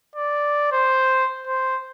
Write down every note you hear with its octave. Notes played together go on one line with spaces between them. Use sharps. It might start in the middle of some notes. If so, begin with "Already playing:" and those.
D5
C5
C5